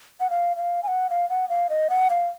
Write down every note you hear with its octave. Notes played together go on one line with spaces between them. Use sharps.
F#5
F5
F5
G#5
F#5
F5
F#5
F5
D#5
F#5
F5